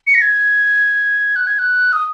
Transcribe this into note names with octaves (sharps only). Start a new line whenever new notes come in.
C#7
A#6
G#6
F#6
G#6
F#6
D#6